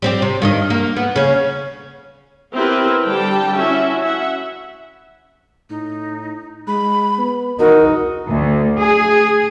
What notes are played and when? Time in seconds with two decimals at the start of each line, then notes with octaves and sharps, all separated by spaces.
0.02 G3 C4 G4
0.22 C3
0.42 G2 D#3 D#5
0.70 A#3
0.96 B3
1.16 C#3 C#4
2.54 B3 C4 E4 G4 A#4 B4
3.02 D3 G3 G5 A5
3.55 C#4 E4 F#4 E5
4.02 E5 F#5
5.70 A2 D#4
6.68 G#3 B5
7.18 B3
7.59 E2 D#4 F#4 A#4
8.28 D2
8.78 G#4